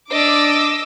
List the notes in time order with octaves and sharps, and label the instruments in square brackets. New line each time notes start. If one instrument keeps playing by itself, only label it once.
[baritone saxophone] D4 [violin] D#5 E6 [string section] D6